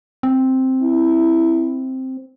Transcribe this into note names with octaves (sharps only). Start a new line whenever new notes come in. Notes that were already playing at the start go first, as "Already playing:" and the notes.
C4
E4